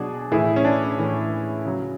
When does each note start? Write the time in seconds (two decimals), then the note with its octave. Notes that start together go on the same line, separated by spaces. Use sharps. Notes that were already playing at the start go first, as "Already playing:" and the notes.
Already playing: B2 F#3 D4 F#4 G#4
0.31 A2 E3 E4 G#4
0.56 C#4
0.65 D4
0.98 A2 E3
1.65 C#3 F#3